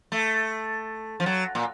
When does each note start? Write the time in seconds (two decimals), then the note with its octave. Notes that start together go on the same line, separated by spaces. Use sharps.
0.12 A3
1.20 F3
1.26 F#3
1.55 A#2